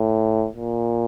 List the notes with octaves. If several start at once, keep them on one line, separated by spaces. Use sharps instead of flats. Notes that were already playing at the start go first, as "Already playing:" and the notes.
Already playing: A2
A#2